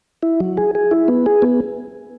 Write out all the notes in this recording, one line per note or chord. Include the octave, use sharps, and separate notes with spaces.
E4
F#3
G#4
G#4
E4
B3
G#4
B3